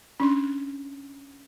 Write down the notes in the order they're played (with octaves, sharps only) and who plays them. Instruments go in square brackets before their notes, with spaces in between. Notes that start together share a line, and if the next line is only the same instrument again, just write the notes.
[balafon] C#4 D4 C6